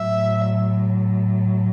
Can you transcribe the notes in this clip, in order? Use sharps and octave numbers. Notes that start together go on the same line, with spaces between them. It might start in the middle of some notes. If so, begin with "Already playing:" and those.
Already playing: A2 F#3 E5